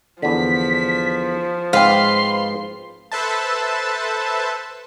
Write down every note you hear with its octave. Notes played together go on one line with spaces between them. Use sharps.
E2 D3 F3 B6
G#2 C4 B4 F5 C6
A4 B4 C5 E5 A5